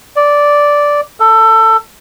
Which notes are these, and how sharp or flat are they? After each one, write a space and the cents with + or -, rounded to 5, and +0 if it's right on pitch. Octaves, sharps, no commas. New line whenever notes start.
D5 -5
A4 +20